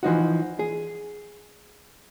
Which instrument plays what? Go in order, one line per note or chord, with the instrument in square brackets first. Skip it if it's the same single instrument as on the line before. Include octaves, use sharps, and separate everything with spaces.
[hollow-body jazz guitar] E3 F3 D#4 F#4
G#4